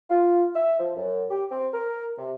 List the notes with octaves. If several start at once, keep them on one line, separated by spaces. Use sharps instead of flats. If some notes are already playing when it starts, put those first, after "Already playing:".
F4
E5
F3
F#2
G4
C4
A#4
C3